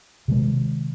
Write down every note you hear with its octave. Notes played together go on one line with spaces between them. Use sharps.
C3 D#3 G#3